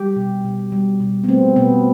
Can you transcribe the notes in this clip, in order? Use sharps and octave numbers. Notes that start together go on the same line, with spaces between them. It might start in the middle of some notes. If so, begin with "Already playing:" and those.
Already playing: G3 G4
B2
B2
G3
B2
B3
A3 C4
B2 B3